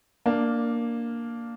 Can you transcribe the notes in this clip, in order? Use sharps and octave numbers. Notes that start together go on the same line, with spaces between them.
A#3 D4